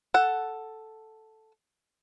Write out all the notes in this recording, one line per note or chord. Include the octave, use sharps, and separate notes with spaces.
A4 F#5